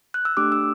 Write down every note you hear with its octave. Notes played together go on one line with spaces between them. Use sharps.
F#6
E6
A3 D4 G4 D6
E6